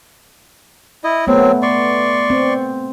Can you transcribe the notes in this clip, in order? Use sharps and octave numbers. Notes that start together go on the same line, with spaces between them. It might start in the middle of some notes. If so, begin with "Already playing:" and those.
E4 D#5
F#3 A3 B3 C4
D5 C6 C#6
C4